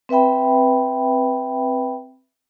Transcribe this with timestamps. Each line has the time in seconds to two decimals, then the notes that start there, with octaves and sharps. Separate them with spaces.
0.09 C4 B4 E5 G5 B5